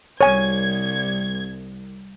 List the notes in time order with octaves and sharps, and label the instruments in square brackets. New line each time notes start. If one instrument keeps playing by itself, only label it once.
[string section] C2 G#6 [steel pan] C#5 G#5